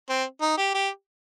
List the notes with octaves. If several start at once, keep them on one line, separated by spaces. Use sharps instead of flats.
C4
D#4
G4
G4